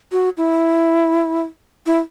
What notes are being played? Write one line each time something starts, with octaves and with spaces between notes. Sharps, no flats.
F#4
E4
E4